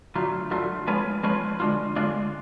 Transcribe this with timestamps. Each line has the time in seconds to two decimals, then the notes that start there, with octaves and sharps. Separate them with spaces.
0.15 D3 F#3 A3 F4
0.51 D3 F#3 A3 F4
0.87 F3 G#3 C#4 F4 B4
1.23 F3 G#3 C#4 F4 B4
1.60 D3 G#3 D4 F4
1.96 D3 G#3 D4 F4